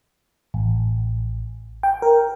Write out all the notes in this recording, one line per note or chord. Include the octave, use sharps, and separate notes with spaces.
A1
G5
A#4